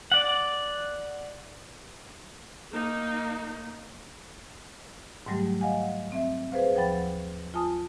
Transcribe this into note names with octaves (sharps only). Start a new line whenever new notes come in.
D5 F#5
A#3 D#4
G#2 D#3 F#3 G3 A3 G4
D#5 F5 F#5 G#5
C4 E5
G#4 B4 C5 F5
D#2 F3 F#5 G5 B5 A6
F4 G#5 A5 D#6